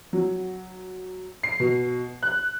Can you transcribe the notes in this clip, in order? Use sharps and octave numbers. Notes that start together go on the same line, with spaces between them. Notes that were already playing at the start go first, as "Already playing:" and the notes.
F#3
C7
B2
F#6